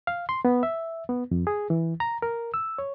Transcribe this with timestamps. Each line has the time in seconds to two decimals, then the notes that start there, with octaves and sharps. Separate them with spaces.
0.07 F5
0.29 C6
0.45 B3
0.63 E5
1.09 B3
1.31 F2
1.47 G#4
1.70 E3
2.00 A#5
2.22 A#4
2.54 E6
2.78 C#5